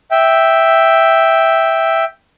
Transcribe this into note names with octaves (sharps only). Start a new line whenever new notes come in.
E5 G5